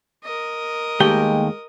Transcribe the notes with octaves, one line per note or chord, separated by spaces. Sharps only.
A#4 D#5
D#2 G#3 A3 G4 G5